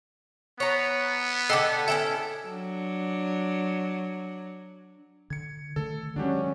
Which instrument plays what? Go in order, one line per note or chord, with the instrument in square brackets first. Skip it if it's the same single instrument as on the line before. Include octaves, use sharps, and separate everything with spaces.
[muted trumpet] B3 [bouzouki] C#5 A#5
[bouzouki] D3 A4 [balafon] D#5 G5 D6
[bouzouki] C#4 E4 A4 [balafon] E5 G5
[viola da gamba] F#3 D4
[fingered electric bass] D3 [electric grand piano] G#6 C#7
[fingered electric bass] D3 D#3 A3 [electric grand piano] A4
[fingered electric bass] D#3 G#3 [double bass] F#3 C#4 [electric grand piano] D4 F#4 G4